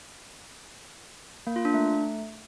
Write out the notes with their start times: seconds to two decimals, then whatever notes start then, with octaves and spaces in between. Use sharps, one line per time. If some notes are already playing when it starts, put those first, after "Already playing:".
1.47 A#3
1.56 F4
1.65 D4
1.74 A3